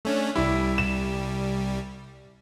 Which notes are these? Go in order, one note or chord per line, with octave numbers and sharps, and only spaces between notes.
A3 C#4 D4
C2 G3 E4
E7